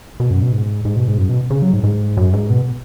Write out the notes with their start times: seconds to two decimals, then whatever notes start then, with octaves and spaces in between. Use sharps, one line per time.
0.20 B2
0.30 F#2
0.42 B2
0.52 G#2
0.85 G#2
0.96 B2
1.08 G#2
1.18 F#2
1.29 B2
1.51 C#3
1.62 F#3
1.74 G#2
1.84 G#2
2.17 F#2
2.33 G#2
2.50 B2